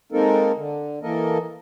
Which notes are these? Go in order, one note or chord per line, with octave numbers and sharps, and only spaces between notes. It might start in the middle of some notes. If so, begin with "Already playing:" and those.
G#3 A#3 C4 D#4 A4 A#4
D3
E3 A#3 A4 A#4 D#5